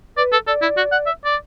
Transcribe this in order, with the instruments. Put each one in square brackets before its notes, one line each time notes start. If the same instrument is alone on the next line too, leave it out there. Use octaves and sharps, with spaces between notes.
[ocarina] B4 [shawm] D5
[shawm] A4
[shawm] A4 [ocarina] D5
[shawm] E4
F#4
F#5
E5
D5